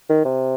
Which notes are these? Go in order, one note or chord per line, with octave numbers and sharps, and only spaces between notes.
D#3
C3